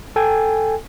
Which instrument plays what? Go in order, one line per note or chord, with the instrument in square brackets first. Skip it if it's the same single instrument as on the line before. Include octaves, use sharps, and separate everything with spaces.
[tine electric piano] A4 G5 G#5